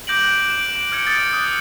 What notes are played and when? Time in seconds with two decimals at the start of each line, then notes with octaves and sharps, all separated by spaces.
0.07 D6 G6 A#6 D7 F#7
0.24 F#6
0.50 D7 E7
0.92 F6 G#6 C#7 D7
1.07 D#6 G#6 A6 C#7
1.33 D#6 F#6